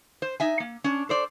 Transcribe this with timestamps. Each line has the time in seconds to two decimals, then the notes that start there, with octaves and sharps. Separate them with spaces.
0.22 C5
0.40 D#4 E5 G#5
0.60 A#3
0.84 C#4 D4
1.09 A4 C5 D5